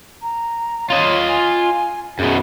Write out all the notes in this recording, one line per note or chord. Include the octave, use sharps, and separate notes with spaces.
A#5
F4 C#5 D#5
G#5
F#2 B2 G#4